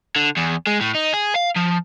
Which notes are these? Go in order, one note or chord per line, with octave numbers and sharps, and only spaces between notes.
D3
E2
G#3
A2
D#4
G#4
F5
F3